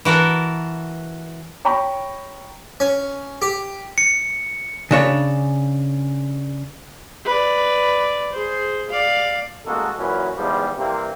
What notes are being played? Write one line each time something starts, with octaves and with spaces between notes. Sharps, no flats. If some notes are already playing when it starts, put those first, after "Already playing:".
E3 F#4 A4 A#4
C#5 G5 A#5 B5 C#6
C#4
G4
C#7
C#3 D4 C#5
B4 D5
G#4 C5
D5 F5
A1 G#3 A#3 F#4 A4
F#2 A#2 E3 C#4 F#4 B4
E2 G#2 E3 F3 G3
C3 E3 G3 A#3 C4